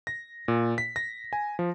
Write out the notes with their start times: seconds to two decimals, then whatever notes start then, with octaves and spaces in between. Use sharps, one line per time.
0.07 A#6
0.48 A#2
0.78 B6
0.96 A#6
1.33 G#5
1.59 F3